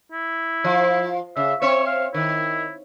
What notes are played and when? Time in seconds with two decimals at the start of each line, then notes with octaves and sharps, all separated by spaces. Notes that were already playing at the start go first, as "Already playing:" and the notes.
0.12 E4
0.64 F3
1.37 C#3 E5
1.62 C4 C#5 E5 C#6
1.87 F5
2.14 D#3 E4